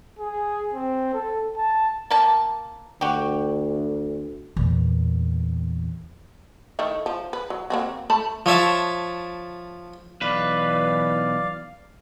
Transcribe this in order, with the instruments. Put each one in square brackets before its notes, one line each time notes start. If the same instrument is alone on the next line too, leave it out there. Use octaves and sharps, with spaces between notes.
[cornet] G#4
C4
A4
A5
[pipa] A#3 A5
[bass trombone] D2 [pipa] F#4 G4
[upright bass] E2 A#2
[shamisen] D#3 A3 E4
F3
B4
F#3
A#3 C4 F#4
A3 A5 B5
[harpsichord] F3 C#5 E5 A5
[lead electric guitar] B1 B4 [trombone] E3 [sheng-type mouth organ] D5 F5